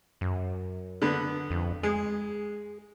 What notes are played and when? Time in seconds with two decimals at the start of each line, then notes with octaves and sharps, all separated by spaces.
0.21 F#2
1.02 D3 B3
1.51 F2
1.83 G#3 G#4